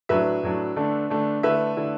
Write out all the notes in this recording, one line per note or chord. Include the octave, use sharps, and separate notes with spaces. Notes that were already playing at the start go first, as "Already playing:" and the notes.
A2 F#3 D4 B4 E5
A2 F#3 D4
D3 A3 D4
D3 A3 D4
D3 A3 E4 B4 E5
D3 A3 E4